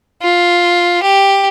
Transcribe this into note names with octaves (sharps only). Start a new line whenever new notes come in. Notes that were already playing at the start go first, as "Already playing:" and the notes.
F4
G4